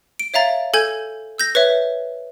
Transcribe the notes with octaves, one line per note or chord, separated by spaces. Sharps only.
D7
C#5 E5 F5 A#5 A6
A4 G#5 G6 G#6
E6 G6 A#6
B4 C#5 E5